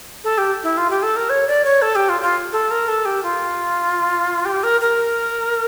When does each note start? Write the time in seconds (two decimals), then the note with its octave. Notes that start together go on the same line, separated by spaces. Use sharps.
0.24 A4
0.38 G4
0.63 E4
0.77 F4
0.90 G4
1.03 A4
1.16 A#4
1.30 C#5
1.47 D5
1.65 C#5
1.82 A4
1.95 G4
2.09 F4
2.22 F4
2.52 A4
2.71 A#4
2.88 A4
3.05 G4
3.23 F4
4.45 G4
4.63 A#4
4.81 A#4